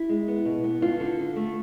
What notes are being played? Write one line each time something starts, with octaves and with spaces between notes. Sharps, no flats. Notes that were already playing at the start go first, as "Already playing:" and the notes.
Already playing: E4
G#3
B3
B2
B3
D3 F4
D3
D3
A3